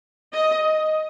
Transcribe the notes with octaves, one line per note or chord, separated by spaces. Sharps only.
D#5